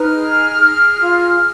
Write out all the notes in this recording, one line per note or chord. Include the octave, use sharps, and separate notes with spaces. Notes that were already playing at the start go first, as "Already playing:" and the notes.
Already playing: D#4 B4 F6
G#4
G#4
F4